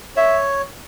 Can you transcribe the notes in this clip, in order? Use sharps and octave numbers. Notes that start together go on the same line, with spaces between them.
C#5 E5